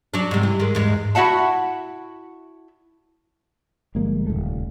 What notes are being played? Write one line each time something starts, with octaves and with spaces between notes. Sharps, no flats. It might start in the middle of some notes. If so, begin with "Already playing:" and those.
F#3 D4
G#2 C3
E3
D#3 G#3
E2 G#2 G#3
E4 F#4 E5 F#5 A5
G1 F3 G#3 A#3
D#1 C#2 A3